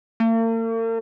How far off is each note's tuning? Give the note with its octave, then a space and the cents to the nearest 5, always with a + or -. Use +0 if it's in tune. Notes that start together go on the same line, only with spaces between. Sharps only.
A#3 -45